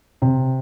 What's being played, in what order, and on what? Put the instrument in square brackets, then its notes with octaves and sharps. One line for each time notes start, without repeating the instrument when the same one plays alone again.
[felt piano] C3